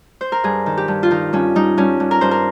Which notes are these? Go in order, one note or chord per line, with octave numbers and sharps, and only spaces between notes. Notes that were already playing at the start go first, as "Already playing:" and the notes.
C5
A#4
G2 G#4
D#3
G4
G2
F4
D#3 D#4
G2 C#4
G3 D#4
G2 C#4
G2
A#4
G2 C5
A#4